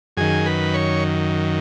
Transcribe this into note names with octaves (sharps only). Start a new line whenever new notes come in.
F#2 D#3 G#4
B4
C#5